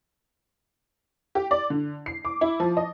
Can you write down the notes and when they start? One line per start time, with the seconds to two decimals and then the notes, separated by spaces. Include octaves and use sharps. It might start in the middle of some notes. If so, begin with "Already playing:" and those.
1.35 G4
1.51 D5
1.70 D3
2.06 C7
2.25 D6
2.41 E4
2.60 F3
2.77 D#5